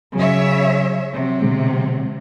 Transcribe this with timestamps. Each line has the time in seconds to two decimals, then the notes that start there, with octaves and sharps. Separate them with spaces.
0.15 C#3 F#3 C#5 E5
1.12 C3 F#3
1.42 B2 D3 G#3